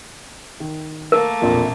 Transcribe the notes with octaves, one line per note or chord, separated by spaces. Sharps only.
D#3
A3 A#3 A#4
E1 A#1 F2 A#2